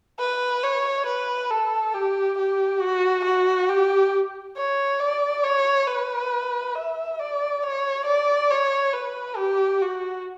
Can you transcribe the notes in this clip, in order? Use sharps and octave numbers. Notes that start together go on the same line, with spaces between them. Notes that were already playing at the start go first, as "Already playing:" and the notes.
B4
C#5
B4
A4
G4
G4
F#4
F#4
G4
C#5
D5
C#5
B4
E5
D5
C#5
D5
C#5
B4
G4
F#4